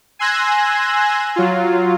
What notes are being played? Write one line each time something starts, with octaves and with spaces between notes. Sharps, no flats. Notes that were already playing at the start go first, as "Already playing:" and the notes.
G#5 C6 E6 F#6 G#6 A#6
F#3 F4